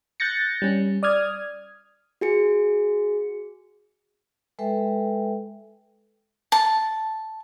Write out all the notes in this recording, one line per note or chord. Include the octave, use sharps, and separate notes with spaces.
F#6 G6 A6 A#6 C#7
G3 C#4
D5 D#6 F6 G#6
F#4 G#4 C#7
G#3 A4 B4 E5 G5
A5